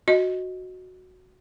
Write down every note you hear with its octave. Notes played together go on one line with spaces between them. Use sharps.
F#4 D#5